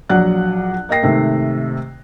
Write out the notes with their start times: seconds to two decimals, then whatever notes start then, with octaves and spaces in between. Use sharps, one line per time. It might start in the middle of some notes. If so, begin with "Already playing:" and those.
0.10 A#1 F#3 D5 F#5 F#6
0.89 A#3 D#5 G5 A#6 C7
1.03 G#2 C3 D#3 A3